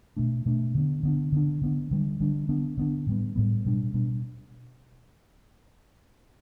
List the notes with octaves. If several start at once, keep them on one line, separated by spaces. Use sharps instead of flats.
B2 A3 D4
B2 A3 D4
D3 B3 D4
D3 B3 D4
D3 B3 D4
D3 B3 D4
D3 G3 D4
D3 G3 D4
D3 B3 D4
D3 B3 D4
A2 G3 B3
A2 G3 B3
B2 G3 D4
B2 G3 D4